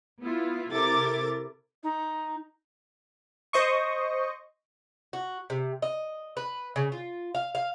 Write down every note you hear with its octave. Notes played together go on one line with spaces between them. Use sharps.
B3 E4 F4
C3 E4 A4 A#4 D6 A6
D#4
C5 D#5 C#6
F#4
C3
D#5
B4
C#3
F4
F5
F5